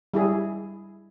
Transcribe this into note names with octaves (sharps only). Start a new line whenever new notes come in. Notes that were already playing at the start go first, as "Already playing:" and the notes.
G3 E4 G#4